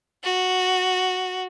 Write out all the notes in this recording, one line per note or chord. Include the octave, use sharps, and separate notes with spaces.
F#4